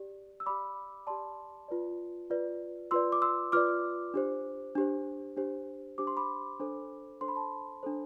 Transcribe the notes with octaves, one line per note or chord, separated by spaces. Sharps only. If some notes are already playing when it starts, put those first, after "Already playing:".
Already playing: G4 D5
E6
G4 D5 B5 D6
G4 D5 A5 C6
F4 B4 D5
F4 B4 D5
F4 B4 D5 C6 E6
D6
C6 E6
F4 B4 D5 D6 F6
D4 G4 C5
D4 G4 C5
D4 G4 C5
D4 G4 C5 D6
C6
B5 D6
D4 A4 C5
D4 A4 C5 C6
B5
A5 C6
D4 A4 C5